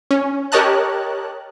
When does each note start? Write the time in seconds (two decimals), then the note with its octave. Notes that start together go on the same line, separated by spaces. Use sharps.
0.11 C#4
0.52 G4 A#4 C#5 D#5 A5 F#6